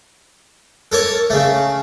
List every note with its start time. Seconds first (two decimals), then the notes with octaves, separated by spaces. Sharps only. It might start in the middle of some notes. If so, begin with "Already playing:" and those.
0.92 A4 A#4 C#5 A5
1.30 C#3 A3